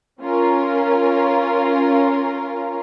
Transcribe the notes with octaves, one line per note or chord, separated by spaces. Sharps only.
C#4 F4 A#4